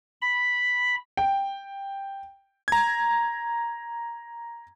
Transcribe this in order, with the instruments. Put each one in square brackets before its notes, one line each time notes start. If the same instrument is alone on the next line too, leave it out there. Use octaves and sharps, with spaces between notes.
[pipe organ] B5
[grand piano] G5
[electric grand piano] A#5 G#6